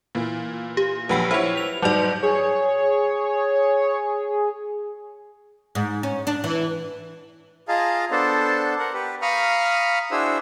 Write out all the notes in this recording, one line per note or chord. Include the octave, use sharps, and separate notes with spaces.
A#2 E3
G4
A#1 F#3 B4 F#5 G5 B5
E4 G4 C5 C#5
F7
G#2 F#3 G3 F#4 D5
G#4 C#5
G#2
C#4
D4
E3
F4 G#4 D#5 F5 A5 A#5
B3 D4 A4 C5 A5
A#4 F#5
G4 B4
F5 A#5 B5 C#6 D#6 F6
D4 E4 F#4 G#4 C5 E6